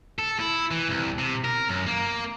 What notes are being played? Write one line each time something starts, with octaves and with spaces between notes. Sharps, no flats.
A4
E4
E3
C2
C3
A#4
F#2
A#3